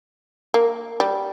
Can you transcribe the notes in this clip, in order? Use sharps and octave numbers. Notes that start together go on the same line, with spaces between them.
A#3
G3